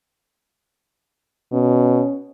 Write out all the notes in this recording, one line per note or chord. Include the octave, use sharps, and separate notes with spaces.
B2 C#4